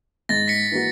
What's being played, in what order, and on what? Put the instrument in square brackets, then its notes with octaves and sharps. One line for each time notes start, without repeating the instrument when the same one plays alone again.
[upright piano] G#2 [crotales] A6 A#6
[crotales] B6 C#7
[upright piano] E3 A#3 F#4